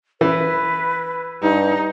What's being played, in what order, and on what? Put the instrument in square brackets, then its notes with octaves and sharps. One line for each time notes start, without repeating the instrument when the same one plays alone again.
[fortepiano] E3 [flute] B4
[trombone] G2 [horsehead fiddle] D#4